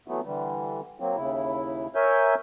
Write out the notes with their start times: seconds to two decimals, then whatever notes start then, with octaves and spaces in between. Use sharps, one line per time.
0.08 E3 F#3 A3 B3
0.25 D3 E3 G3
1.00 F#3 A#3 C4
1.17 D#2 C#3 E4
1.95 A#4 C#5 E5 G#5 G6